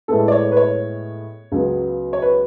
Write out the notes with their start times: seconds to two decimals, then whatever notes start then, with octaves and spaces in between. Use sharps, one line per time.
0.08 A2 G#3 B3 A4
0.28 D5
0.32 C#5
0.52 B4
0.57 C#5
1.52 C#2 C#3 F#3 B3
2.13 C#5
2.22 B4